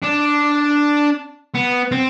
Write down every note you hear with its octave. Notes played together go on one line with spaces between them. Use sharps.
D4
B3
C4